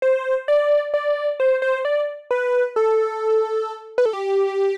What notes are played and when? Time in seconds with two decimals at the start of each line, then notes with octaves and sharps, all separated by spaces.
0.02 C5
0.48 D5
0.94 D5
1.40 C5
1.62 C5
1.85 D5
2.31 B4
2.76 A4
3.98 B4
4.06 A4
4.13 G4